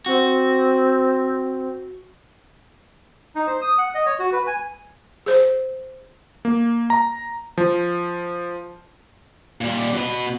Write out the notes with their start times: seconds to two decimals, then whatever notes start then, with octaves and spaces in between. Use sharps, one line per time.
0.06 C4 F#4
3.36 D#4
3.47 C5
3.62 D#6
3.78 F#5
3.95 D#5
4.06 C#5
4.19 F#4
4.32 B4
4.47 G#5
5.26 G#4 C5
6.45 A#3
6.90 A#5
7.57 F3
9.61 A#2 G3
9.93 B2 B4